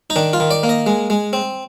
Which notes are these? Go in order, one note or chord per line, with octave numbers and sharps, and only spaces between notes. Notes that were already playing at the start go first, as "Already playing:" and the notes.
D#4
D#3 D4
F4
D#3
D5
A#3
D#5
G#3
G#3
C4